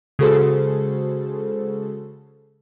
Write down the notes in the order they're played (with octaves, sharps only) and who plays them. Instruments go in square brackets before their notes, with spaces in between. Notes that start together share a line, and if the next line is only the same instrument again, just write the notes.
[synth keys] C#3 G#3 F#4 G#4 A4 C5